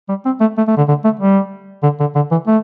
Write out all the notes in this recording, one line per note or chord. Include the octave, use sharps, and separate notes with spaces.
G3
C4
A3
A3
A3
D3
D3
A3
G3
D3
D3
D3
E3
A3